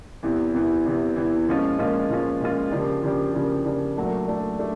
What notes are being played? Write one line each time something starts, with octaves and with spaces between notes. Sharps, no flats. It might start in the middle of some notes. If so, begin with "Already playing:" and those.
E2 C3 E3
E2 C3 E3
E2 C3 E3
E2 C3 E3
A#2 F3 G#3 C#4 F4
A#2 F3 G#3 C#4 F4
A#2 F3 G#3 C#4 F4
A#2 F3 G#3 C#4 F4
C#3 F3 A#3 D4 G4
C#3 F3 A#3 D4 G4
C#3 F3 A#3 D4 G4
C#3 F3 A#3 D4 G4
A#2 F#3 A3 D4
A#2 F#3 A3 D4
A3 D4